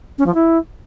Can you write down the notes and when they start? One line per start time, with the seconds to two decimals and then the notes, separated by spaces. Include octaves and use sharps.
0.18 C#4
0.26 F3
0.34 E4